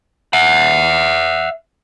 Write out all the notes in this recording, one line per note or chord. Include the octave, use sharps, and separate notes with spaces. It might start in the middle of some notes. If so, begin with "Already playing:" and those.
E5 F#5